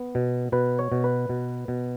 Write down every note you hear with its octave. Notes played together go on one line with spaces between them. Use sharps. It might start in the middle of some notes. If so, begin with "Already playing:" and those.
Already playing: B3
B2
B2 B4
C#5
B2
B4
B2
B2